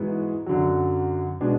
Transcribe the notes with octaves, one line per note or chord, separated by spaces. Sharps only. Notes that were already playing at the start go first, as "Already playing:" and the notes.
Already playing: G#2 E3 G#3 B3 F#4
F#2 D3 F#3
B2 G#3 D4